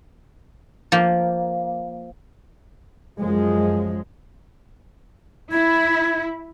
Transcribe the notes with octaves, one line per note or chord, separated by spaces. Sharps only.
F3 A#3
F#2 F3 G#3
E4 G#6